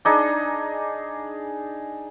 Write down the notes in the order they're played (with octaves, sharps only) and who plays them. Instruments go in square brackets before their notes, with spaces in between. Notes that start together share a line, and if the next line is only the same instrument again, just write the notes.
[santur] D4 D#4 G#4